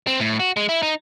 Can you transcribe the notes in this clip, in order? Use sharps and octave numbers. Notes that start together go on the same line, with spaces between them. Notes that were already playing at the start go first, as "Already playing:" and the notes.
C4
A2
F#4
G#3
E4
D#4